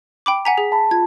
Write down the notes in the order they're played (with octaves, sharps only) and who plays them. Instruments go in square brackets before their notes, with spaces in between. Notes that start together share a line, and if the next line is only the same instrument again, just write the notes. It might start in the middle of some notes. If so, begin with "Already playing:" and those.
[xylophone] G5 B5 D6
[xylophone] F#5 G#5 A#5 [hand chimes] B6
[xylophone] G#4
[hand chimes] A5 B5
[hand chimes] F4 [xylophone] G#6